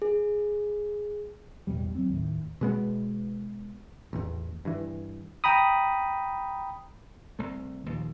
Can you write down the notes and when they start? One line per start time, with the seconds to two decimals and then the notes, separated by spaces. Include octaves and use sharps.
0.02 G#4
1.67 A1 E2 B2 G3
1.95 F#3 C4
2.09 D#2 A2
2.61 B2 G#3 B3
4.13 A1 E2
4.65 G2 E3
5.44 G5 A#5 B5 D#6
7.39 C2 A3
7.86 D#2 A#2 F3